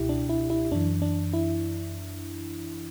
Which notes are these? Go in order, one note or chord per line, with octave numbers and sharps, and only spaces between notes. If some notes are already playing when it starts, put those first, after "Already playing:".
Already playing: C#2 B2 E4 G4
D4
E4
E4
F#2 E3 D4
D4
E4